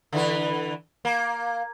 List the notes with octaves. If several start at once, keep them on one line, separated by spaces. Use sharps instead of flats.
D3 E3 B4
A#3